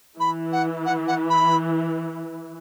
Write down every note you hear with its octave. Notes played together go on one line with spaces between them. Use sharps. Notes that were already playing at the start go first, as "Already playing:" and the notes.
E3 B5
F#5
F#5
F#5
B5